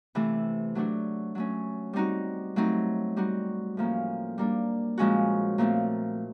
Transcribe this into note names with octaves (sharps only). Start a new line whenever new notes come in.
C3 E3 A3
F#3 A3 D4 F#4
F#3 A3 C#4
G3 C4 D#4 F#4
F#3 A3 C4 D#4
G3 C4 D#4 F#4
A2 F3 A#3 C#4
G3 A#3 D4
A#2 F3 G#3 C#4 F#4
A#2 F3 A3 C4